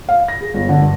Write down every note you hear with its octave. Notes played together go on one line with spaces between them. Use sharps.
F5
A#6
G#4
G1
D3
G2